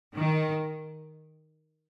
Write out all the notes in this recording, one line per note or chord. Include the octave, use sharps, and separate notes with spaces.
D#3